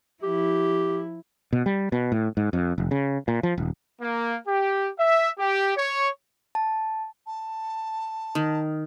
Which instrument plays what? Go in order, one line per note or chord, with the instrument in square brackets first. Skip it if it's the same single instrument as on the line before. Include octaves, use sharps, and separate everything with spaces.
[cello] F3 E4 [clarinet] G4
[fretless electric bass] B2
G3
B2
A2
G#2
F2
F1
C#3
A#2
F3
D#1
[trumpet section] A#3
G4
E5
G4
C#5
[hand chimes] A5
[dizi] A5
[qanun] D#3